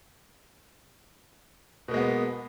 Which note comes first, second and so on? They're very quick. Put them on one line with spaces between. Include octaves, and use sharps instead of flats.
B2 A#3 G#3 B3